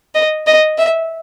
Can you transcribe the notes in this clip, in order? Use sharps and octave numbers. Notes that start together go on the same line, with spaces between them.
D#5
D#5
E5